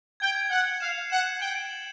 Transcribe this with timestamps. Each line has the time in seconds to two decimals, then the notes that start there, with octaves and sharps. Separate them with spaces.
0.20 G5 G#6
0.35 G#6
0.50 F#5 G#6
0.65 C#7
0.80 F5 E7
0.96 C7
1.10 F#5 E7
1.25 G6
1.40 G5 F#7
1.55 A6
1.71 F#7